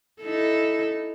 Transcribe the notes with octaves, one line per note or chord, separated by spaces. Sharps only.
D#4 E4 A4